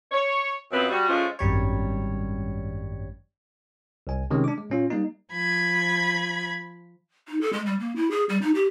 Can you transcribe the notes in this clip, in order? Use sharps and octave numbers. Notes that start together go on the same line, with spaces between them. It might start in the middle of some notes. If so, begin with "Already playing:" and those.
C#5
F#2 F3 B3 C4 B4
G3 F#4
F3 G#3 A3 C#4 F4
G#1 F#2 G3 C#5
C2 G#5
C3 D#3 G#3 C#4
D4 D6
G#3
A#2 C#4 F4
G3 A#3 D#4
F3 B5 G#6
D#4
A4
G#3
G3
A#3
E4
G#4
G3
D#4
G4